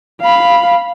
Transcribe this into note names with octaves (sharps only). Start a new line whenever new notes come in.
F5 B5